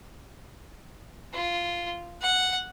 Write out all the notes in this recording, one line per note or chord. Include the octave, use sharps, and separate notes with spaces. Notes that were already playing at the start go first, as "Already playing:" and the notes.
F4
F#5